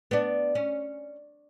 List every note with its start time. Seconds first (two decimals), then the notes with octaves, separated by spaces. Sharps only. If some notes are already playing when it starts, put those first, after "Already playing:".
0.11 B3 D4
0.55 C#4